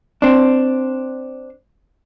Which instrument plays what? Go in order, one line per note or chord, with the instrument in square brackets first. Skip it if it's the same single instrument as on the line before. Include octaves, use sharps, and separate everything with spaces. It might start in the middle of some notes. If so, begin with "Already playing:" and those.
[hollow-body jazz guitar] C4 D4